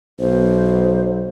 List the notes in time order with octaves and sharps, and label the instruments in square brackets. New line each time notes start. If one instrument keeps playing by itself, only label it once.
[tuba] B1 [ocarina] C5